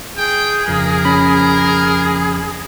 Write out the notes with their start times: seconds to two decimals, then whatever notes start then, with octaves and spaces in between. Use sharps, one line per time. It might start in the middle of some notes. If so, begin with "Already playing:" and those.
0.17 G#4 G5
0.68 F2 C#3 A#4
1.05 C#4 B5